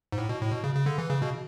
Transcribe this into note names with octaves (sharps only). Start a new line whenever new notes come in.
G#2
A2
B2
A2
B2
C#3
C#3
D3
E3
C#3
B2